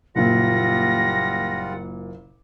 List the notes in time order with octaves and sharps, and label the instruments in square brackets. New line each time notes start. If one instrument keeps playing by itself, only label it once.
[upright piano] F#1 A#2 [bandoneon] G3 F4 F#5 [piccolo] A#6